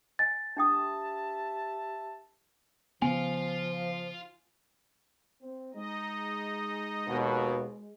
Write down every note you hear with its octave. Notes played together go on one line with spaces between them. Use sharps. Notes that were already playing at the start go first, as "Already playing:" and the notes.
D#5 G#5 A6
D4 G4 E5 G5 A5 D#6
C#3 F3 B3 F4 F5 G#5
C4
G#3 D#4 D#5
D#2 B2